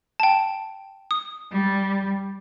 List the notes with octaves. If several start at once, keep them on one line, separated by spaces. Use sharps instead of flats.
G5 A5
D#6
G3